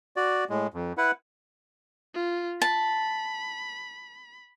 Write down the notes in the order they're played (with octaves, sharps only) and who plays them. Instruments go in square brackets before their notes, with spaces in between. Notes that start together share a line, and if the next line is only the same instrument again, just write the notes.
[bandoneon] F#4 D5
A2 G#3
F2
E4 B4 F#5
[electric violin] F4
[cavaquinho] A5 [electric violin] B5